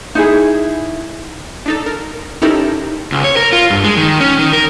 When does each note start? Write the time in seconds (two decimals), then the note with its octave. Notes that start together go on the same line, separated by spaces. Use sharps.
0.15 D#4 E4 G#4
1.66 D4 D#4 A4
1.86 A#4
2.42 C#4 D#4 E4 G4 A4 A#4
3.12 C#2
3.24 C#5
3.37 A#4
3.52 F4
3.70 G2
3.84 G#3
3.97 D#3
4.21 C#4
4.39 D#3
4.53 A#4